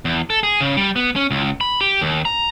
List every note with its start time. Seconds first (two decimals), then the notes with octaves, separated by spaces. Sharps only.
0.05 E2
0.30 A4
0.43 G#4
0.61 C#3
0.77 G3
0.96 B3
1.16 C#4
1.31 C#2
1.61 B5
1.81 G4
2.01 D#2
2.25 A#5